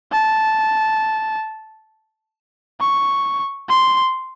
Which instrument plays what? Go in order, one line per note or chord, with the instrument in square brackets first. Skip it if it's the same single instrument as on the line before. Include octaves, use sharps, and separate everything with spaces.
[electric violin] A5
C#6
C6